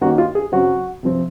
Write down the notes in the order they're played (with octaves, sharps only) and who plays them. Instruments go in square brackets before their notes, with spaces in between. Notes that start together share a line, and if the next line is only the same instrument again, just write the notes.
[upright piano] D#3 A#3 C#4 F#4
F4
G#4
C#3 F#3 C4 F#4
C3 F3 C4